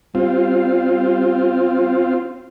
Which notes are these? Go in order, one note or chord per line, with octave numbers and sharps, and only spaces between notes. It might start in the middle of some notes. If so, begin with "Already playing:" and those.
G3 C4 F4